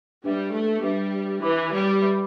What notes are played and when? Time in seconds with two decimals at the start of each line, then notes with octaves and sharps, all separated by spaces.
0.24 G3 D4 B4 E5
0.53 A3
0.83 G3 D4 B4 E5
1.41 E3 B4 E5 B5 D6
1.72 G3
2.01 B4 E5 B5 D6